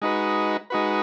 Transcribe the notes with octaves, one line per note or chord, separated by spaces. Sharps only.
G#3 D#4 F#4 B4
G#3 D#4 F#4 B4